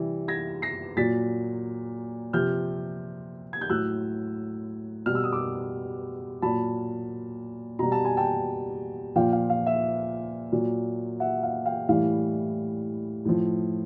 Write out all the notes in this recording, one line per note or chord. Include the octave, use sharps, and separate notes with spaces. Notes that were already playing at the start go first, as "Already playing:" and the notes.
Already playing: C3 E3 G3
G#6 A#6
A#6 C7
A#2 F#3 A6 B6
C3 F3 F6 G6
G#6
G6
A2 F#3 E6 F#6
B2 G3 F6
E6
D#6
D6 E6
A#2 F#3 A5 B5
B2 G3 A#5
A5
G#5
G5 A5
A#2 F3 F5 G5
F5
F5
E5
A#2 F#3
E5 F#5
F5
F5 G5
A2 E3 G3 F5
A2 F3